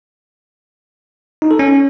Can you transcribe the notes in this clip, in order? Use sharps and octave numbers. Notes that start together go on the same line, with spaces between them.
D#4
A4
C#4